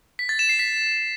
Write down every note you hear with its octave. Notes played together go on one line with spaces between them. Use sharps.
B6
A6
E7
C7
B6